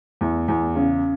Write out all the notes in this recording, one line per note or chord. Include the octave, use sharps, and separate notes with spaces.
E2
E2
C#3